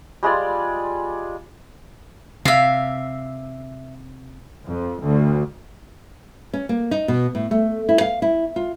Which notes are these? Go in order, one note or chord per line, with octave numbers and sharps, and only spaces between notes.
G3 G#3 F4 D5
C3 E5 F5
F2
D2
C#4
A#3
D#4
B2
A2
A3
E4
F5
E4
F4